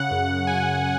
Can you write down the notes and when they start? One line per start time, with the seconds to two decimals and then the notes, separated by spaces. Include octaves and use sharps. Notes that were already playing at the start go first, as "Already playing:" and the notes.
Already playing: C#3 F#5
0.11 F#2
0.47 C#3 G#5